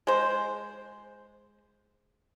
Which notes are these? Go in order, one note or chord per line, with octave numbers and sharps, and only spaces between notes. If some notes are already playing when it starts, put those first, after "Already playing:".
G#3 C5